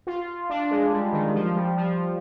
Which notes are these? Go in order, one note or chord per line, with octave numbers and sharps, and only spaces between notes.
F4
D4
G#3
G3
D#3
F3
G3
F3